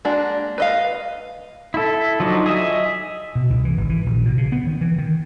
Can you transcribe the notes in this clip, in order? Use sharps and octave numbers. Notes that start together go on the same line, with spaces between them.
G#3 A#3 D4 F#4
B4 D#5 F5
E4 A4
F3 F#3 D4 D#4
G#4 D#5 E5 G#5
B2
C2
E3
G#1
E3
A#1
B2
C#3
B3
D#3
E3
D#3